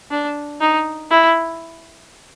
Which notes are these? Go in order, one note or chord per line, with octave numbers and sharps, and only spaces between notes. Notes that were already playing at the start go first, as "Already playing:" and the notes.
D4
D#4
E4